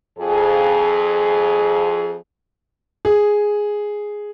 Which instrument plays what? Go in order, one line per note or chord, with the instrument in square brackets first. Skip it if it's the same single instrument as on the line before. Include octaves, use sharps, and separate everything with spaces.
[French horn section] F2 G#4
[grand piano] G#4